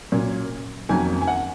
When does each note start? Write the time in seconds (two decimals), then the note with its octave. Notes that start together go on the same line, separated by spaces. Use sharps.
0.12 A#2 F#3 C#4
0.89 F2 D#3 F#3 A#3 C#4 G#5
1.21 G#5
1.28 F#5